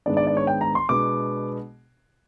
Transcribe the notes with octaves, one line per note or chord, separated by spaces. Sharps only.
G#2 D#3 G#3 B3 D4 D5
D5
D5
C#5
G5
A#5
C6
B2 G#3 B3 D4 D6